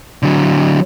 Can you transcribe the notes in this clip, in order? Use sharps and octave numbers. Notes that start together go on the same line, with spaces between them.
D3 F#3